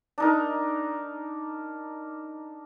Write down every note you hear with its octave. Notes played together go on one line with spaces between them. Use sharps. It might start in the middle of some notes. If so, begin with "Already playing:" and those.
D4 D#4 A#4